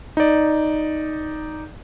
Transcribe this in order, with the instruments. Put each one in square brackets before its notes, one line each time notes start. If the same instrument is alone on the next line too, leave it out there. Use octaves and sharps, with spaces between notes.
[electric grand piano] D#4 D5